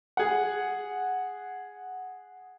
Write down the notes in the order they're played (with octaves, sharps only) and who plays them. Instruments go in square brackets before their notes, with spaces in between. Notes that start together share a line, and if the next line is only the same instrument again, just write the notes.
[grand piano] G#4 F#5